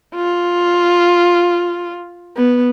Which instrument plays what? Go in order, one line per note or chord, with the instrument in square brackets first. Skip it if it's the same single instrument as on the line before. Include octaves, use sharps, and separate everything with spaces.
[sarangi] F4
B3